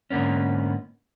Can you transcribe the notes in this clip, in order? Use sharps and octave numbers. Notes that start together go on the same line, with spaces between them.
G#2 D3 A#3 B3 C#4